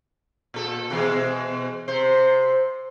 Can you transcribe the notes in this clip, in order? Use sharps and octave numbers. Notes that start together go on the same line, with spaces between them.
A#2 A4
B2 E3 G#3
C3 C5